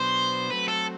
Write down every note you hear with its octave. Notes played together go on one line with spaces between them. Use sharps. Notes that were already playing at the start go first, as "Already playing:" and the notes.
Already playing: B2 F#3 B3 D4 C5
F#3 A3 C4 B4
A4